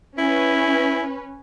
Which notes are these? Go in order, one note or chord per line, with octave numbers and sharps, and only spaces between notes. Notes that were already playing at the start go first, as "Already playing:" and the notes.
C#4 E4 B4